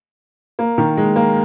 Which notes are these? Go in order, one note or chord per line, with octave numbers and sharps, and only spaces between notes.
A#3
D#3
G#3
A#3